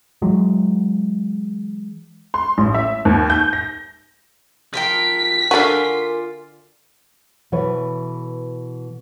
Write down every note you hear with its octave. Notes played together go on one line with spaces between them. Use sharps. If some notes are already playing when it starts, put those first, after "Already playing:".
E3 F#3 G#3
C6
A1
E5
D#2
G6
A#6
F3 A#4 G5 B6
D3 F4 F#4 A#4 D5 G#5
B2 E3 A4 B4 C#5